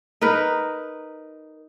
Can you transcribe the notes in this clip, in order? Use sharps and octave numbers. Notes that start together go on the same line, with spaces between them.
D#4 A#4 B4